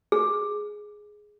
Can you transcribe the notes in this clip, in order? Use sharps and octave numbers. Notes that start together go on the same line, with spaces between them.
G#4